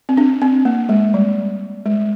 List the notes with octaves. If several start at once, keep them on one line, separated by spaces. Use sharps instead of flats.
C4
D4
C4
A#3
G#3
G3
G#3